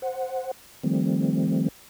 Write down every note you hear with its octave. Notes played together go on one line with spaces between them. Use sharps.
C5 F#5
D#3 F3 G3 A3 C4